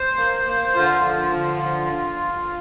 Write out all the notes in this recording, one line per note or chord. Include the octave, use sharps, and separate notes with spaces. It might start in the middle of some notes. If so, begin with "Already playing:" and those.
Already playing: C5
A#3
A#3
D3 F4
F3
D3
F3